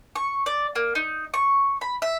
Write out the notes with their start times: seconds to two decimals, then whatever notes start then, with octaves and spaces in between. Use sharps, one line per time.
0.16 C#6
0.46 D5
0.76 A#3
0.95 D#4
1.34 C#6
1.81 B5
2.02 E5